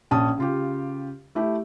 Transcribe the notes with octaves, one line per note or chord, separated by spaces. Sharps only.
A#1 C#4 A5 D#6
C#3 F4 G4
A3 E4 G4